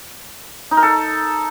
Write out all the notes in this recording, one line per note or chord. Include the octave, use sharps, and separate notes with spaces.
D#4
A#4
A4